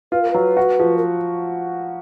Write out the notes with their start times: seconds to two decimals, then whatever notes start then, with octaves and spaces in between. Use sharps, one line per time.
0.12 F4 B4
0.22 A#4
0.31 F#3 B4
0.57 F#4
0.79 F3
0.97 A#4